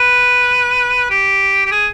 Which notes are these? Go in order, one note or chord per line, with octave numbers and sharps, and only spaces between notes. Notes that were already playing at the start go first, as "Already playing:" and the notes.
Already playing: B4
G4
G4
G#4